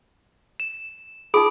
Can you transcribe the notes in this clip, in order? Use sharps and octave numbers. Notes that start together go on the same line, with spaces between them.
E7
D#4 F4 G#4 B5 D#6 D7